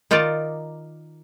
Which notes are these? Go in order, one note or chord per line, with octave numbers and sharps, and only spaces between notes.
D#3 D#4 F4 A#4 D5